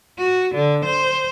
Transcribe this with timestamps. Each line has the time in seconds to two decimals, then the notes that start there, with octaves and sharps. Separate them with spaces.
0.18 F#4
0.55 D3
0.85 C5